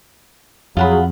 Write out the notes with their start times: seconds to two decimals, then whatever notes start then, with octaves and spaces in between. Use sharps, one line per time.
0.77 F2 F#3 F4 G#4 F#5 B5